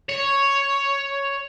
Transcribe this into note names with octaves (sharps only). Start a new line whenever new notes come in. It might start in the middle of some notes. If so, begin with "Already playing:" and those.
C#5